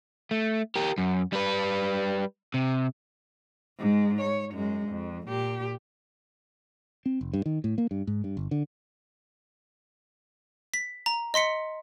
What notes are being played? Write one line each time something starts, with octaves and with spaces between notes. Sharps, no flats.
A3
G4 A#4
F#2
G3 B4
C3
G#2 G#3
C#5
F#2 G#3
F2
A#2 G4
C4
F1
G2
D#3
A2
A#3
G2
G#2
G2
G1
D3
B6
A#5
D#5 C6 B6 C#7